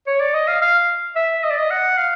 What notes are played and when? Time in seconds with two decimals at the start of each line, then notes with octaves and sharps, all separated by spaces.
0.07 C#5
0.20 D5
0.34 D#5
0.48 F5
0.61 F5
1.16 E5
1.44 D#5
1.50 D5
1.58 D#5
1.71 F#5
1.98 F5